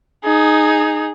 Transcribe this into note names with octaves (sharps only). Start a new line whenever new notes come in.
D#4 G#4